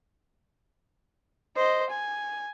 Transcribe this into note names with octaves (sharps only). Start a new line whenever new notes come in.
C5 D#5
G#5